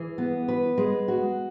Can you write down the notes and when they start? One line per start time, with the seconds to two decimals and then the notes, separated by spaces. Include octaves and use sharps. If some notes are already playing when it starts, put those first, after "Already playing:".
Already playing: E3 G#4
0.18 B3
0.48 B4
0.78 G#3
1.08 F#4